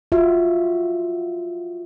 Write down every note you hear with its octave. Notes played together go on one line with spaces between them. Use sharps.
F4 F#4 E5